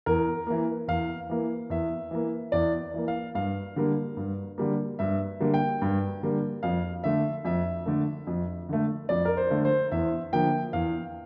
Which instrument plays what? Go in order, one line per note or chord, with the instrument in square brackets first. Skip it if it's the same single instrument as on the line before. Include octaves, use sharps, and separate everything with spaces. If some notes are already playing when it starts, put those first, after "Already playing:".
[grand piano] E2 A#4
E3 A#3
E2 F5
E3 A#3
E2 E5
E3 A#3
E2 D5
E3 A#3
F5
G2 F5
D3 G3 A#3
G2
D3 G3 A#3
G2 E5
D3 G3 A#3
G5
G2
D3 G3 A#3
F2 F5
D3 A3 E5
F2 E5
D3 A3
F2
D3 A3
F2 D5
A#4
C5
D3 A3
C5
E2 E5
D3 F3 A#3 G5
E2 F5